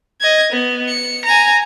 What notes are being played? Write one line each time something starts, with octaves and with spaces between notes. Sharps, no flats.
D#5 G#6
B3
C#7
G#5 A#5